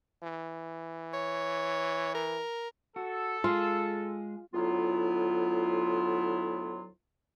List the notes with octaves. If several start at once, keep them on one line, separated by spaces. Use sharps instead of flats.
E3
C#5
A#4
F#4 A4
G#3 F4 G#4
D2 A2 F#3 B3 E4 F4